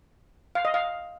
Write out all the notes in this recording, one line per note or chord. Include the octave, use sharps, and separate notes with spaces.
F5
D#5
F5